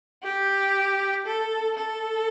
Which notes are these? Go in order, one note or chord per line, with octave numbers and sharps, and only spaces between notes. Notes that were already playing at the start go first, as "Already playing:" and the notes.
G4
A4
A4